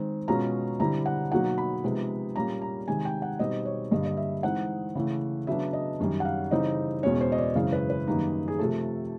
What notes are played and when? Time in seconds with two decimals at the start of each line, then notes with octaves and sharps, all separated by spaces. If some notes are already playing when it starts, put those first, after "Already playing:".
Already playing: D#3 G#3 C4
0.28 B2 G#3 C#4 F4 A#5
0.80 D3 G3 C4 E4 A#5
1.06 F#5
1.32 B2 F#3 A#3 D#4 F#5
1.58 B5
1.84 C3 F3 G#3 B3 D#4
2.36 A#2 G3 A#3 C#4 A#5
2.62 A#5
2.88 C3 D#3 G#3 G#5
3.05 G5
3.22 F#5
3.39 B2 G3 C4 D#4 D#5
3.65 C#5
3.91 G2 D3 G3 A#3 D#5
4.06 D#5
4.17 E5
4.43 E3 G#3 C4 D#4 F#5
4.95 C#3 E3 A3
5.47 C#3 F#3 B3 D4 E5
5.73 D#5
6.00 F#2 D#3 G3
6.20 F#5
6.25 F5
6.51 C#3 E3 G3 C4 D#4 D#5
7.03 E2 B2 G#3 C#4 C#5
7.21 C5
7.32 D#5
7.38 D5
7.55 F#2 C#3 E3 G#3 C4 F5
7.72 B4
7.90 B4
8.07 F#2 D#3 G3 A#3 D#4
8.48 G#4
8.59 C3 F3 A3 A4